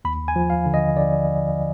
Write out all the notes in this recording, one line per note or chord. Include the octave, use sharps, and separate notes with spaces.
D#2 B5
G#5
F3
F5
D3
D#5
D3 D5